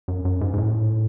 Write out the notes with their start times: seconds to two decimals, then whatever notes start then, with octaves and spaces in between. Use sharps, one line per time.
0.08 F#2
0.25 F#2
0.41 G#2
0.54 G#2
0.58 A2